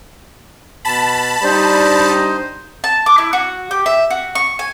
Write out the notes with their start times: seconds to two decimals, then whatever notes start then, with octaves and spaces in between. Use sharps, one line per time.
0.85 B2 A5 B5
1.43 G3 D4 D#4 C5
2.84 A5
3.06 D6
3.18 E4
3.33 F#4
3.71 G4
3.86 E5
4.10 F#4
4.35 C#6
4.59 G#5